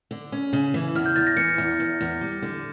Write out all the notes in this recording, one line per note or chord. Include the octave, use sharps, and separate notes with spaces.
D3
C#4
C#3
E3
E2 F6
G6
E2 A6
A#6
E3 C#7
E2
E2
E2
G3
D3